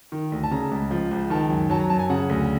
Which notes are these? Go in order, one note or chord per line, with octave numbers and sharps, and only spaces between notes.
D#3
D2
A5
C#3 A#5
C#2
F3
C#2
D#3 A5
F#2
F#3 A5
A#5
F#2 A5
G#5
C#3 F#5
D2